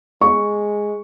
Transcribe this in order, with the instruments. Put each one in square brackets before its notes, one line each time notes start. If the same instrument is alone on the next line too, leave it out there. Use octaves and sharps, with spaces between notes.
[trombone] G#3 [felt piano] C#6